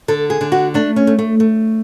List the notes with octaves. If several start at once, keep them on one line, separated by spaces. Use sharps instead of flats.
D3 A4
G#4
D3
F#4
A3 D4
C#4
A3
A3
A3